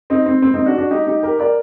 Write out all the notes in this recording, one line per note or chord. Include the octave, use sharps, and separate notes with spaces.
C4 D#4
C4
C4
C4 D#4
D4 F#4
D4 F#4
D#4 G4
D#4 G4
G4 A#4
A#4 D5